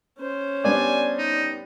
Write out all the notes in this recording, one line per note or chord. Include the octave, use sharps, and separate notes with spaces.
C#4 C5
G3 B3 D4 D5 G#5
D#4